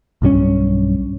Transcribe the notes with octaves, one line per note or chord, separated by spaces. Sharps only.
B1 G2 E3 C#4